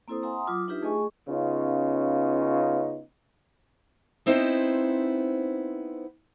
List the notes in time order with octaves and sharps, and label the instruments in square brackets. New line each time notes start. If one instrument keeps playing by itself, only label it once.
[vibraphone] A#3 C4 E4 A4 C5 D#6
E5 F#5 G#5 A#5 C6 D#6
F#3 F4 D6 D#6
D4 D#4 F4 G4 B4 E5
A3 G#4 D#5 G#5 C#6
[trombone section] C#3 B3 C#4 D#4 F4
[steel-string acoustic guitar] B3 C4 D#4 E4 C5